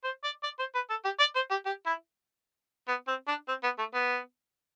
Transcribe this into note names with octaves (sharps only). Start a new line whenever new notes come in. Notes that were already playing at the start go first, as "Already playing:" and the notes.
C5
D5
D5
C5
B4
A4
G4
D5
C5
G4
G4
E4
B3
C4
D4
C4
B3
A3
B3